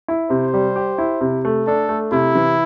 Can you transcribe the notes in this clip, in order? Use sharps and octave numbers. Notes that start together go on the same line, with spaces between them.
E4
C3 C5
G3
G4
E4
C3
A3
D4 A4
A3
C3 E4
E3